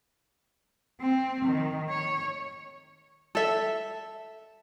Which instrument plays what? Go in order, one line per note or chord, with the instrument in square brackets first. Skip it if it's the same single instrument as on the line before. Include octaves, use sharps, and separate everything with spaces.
[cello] C4
D#3
C#5
[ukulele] A4 E5